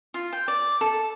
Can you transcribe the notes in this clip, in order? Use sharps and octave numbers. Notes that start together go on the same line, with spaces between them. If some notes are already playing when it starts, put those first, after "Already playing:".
F4
G5
D5
A4